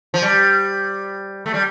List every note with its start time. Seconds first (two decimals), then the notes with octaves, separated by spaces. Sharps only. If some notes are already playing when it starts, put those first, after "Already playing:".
0.14 F3
0.22 G3
1.46 A3
1.54 G3